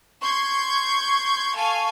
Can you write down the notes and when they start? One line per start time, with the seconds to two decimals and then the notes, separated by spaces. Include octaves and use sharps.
0.21 C6 C#6 G6 G#6
1.55 A4 F5 G#5